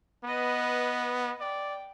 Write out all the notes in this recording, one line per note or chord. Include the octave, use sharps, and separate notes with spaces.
B3 B4 D#5
D5 G5